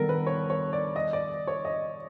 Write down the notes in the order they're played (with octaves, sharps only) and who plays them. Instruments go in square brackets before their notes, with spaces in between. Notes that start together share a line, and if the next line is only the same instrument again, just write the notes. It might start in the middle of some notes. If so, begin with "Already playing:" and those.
Already playing: [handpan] D#3 G3 B3 [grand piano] A4 A#4
[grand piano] B4
C#5
C#5
D5
D#5
D5
C#5
D#5